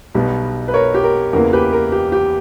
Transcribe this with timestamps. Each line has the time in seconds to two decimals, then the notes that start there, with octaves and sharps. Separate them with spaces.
0.14 B1 B2 G3 B3
0.68 B4
0.74 A#4 C#5
0.94 G4
1.04 A#4
1.33 E2 C#3 E3 A#3 A#4
1.53 G4 B4
1.73 A#4
1.92 G4
2.12 G4